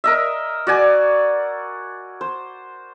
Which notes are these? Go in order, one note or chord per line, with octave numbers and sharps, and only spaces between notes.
A#4 D#5 E5
F#4 D5 G#5
C5